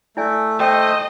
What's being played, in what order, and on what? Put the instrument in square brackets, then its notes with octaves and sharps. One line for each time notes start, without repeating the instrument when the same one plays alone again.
[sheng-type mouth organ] A3 [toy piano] E4 D5 G#5
[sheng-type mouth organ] A3 C5 [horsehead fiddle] D#5 [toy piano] G5 D#6